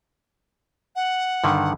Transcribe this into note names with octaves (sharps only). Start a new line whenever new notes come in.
F#5
G2 D3 D#3